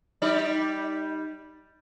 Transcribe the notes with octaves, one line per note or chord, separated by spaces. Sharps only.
G3 D#4 D5